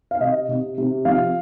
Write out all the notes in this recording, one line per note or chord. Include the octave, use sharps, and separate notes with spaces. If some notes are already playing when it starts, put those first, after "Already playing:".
F5
C3 D#5
C3
C3
F3 F5